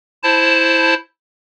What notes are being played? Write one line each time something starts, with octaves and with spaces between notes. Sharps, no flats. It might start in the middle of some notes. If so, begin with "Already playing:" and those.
E4 C5 A5